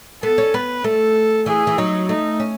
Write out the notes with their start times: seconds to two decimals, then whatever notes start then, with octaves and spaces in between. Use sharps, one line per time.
0.23 B3 A4
0.38 C#4
0.54 B3 B4
0.84 A3 A4
1.46 E3 G#4
1.67 E3
1.78 F#3 D#4
2.09 A3 D#4
2.40 C#4